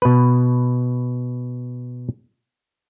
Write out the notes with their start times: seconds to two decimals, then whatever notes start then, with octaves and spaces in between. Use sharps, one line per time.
0.02 B2 B4